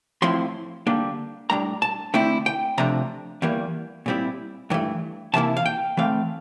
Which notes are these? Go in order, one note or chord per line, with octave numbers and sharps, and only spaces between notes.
A2 F3 C4 E4 C6
D3 G3 A#3 D4
A2 G3 D4 A#5
A5
D3 A3 C4 E4 G5
G5
C3 F3 A3 D4 A#5
E2 E3 G3 A#3
A#2 G3 C4 E4
G2 E3 A3
C3 E3 A#3 E4 A5
F5
G5
A2 E3 A3 C4 F5